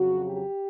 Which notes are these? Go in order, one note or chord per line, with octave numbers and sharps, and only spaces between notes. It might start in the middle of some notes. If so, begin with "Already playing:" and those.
Already playing: F2 C#3 F#3 F#4
G4